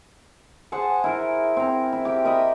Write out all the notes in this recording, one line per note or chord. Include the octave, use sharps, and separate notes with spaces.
G#4 C5 F#5 A5
E4 A#4
C4 A#5
E4
G4 G5
A#4 D#5 E5 B5